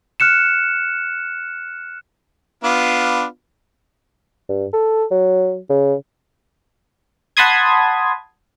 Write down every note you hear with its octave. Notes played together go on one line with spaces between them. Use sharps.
F6 F#6 C#7 E7
B3 D4 F4
G2
A4
F#3
C#3
F#5 A5 B5 C6 D#6 G#6